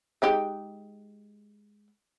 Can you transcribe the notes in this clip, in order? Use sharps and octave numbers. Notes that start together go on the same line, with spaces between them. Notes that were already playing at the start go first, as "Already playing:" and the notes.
G#3 D#4 G4